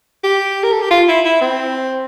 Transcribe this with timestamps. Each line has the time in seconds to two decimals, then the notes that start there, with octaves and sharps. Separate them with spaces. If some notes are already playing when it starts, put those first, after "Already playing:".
0.23 G4
0.63 A#4
0.72 A4
0.82 G4
0.91 F4
1.08 E4
1.25 E4
1.41 C4